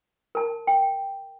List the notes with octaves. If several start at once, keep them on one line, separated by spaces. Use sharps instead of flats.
A#4 A5
G5